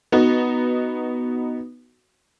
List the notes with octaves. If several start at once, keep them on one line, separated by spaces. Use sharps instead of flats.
B3 D#4 F#4